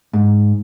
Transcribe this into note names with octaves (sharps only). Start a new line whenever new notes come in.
G#2